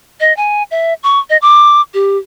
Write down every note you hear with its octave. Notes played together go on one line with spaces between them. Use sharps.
D#5
G#5
E5
C#6
D#5
D6
G4